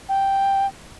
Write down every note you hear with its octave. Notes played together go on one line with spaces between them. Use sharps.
G5